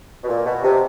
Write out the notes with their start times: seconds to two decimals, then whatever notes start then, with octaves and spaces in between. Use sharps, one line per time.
0.23 B2
0.28 A#2
0.45 B2
0.63 C3